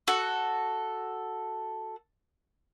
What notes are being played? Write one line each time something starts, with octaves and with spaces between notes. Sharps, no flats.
F#4 A4